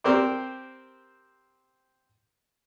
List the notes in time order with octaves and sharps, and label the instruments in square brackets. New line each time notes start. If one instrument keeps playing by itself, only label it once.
[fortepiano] C4 G4 A#4 C5 D5